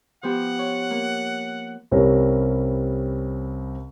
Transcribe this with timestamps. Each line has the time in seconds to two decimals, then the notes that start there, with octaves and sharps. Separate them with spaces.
0.23 F3 B3 G4 F#5
0.59 C#5
0.91 A#3
1.91 C2 G3 C4 C#4 A#4 C#5